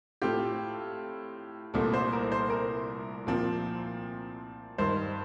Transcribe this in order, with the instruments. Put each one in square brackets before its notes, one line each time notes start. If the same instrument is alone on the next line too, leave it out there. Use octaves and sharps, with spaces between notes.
[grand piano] A2 A3 C4 F4 [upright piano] G4
[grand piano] C2 A#2 A3 C4
[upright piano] C5
A#4
C5
A#4
[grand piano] A#2 F3 C4
[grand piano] G2 D#3 G3 [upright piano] C5